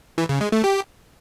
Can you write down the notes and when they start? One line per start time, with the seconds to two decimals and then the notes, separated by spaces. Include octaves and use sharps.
0.18 E3
0.29 C#3
0.41 G#3
0.52 A3
0.64 G4